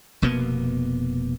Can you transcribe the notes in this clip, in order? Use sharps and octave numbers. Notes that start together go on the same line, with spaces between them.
F1 B2 A#3 B3